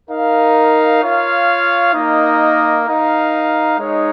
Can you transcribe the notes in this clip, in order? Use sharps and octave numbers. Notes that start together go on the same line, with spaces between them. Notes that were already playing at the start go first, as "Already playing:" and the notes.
D#4 A#4 F5
F4 C#5 F5
A#3 D#4 A#4 D#5
D#4 A#4 F5
G#3 D#4 C#5